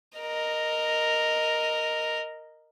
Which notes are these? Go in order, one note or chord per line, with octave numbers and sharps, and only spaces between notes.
A#4 D#5